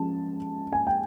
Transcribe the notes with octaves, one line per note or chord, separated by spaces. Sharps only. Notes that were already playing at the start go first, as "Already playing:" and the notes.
Already playing: F3 G#3 C#4 A5
G#5
G5